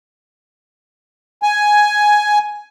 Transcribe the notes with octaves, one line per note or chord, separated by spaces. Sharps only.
G#5